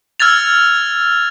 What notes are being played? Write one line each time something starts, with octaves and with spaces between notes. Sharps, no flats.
E6 F6 G#6 A6 F7